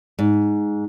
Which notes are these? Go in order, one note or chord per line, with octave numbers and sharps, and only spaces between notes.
G#2